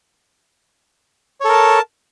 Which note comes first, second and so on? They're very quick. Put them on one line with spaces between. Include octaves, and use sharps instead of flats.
C#5 A4 A#4 A5